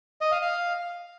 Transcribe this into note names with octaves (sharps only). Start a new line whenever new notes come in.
D#5
F5
F5